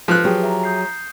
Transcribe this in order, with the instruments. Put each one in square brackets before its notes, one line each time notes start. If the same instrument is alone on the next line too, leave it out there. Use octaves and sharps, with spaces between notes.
[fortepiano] F3 F#6 [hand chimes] B4
[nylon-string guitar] F#3 G4 G#4
[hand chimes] E5 A#5
D#6 G6 C7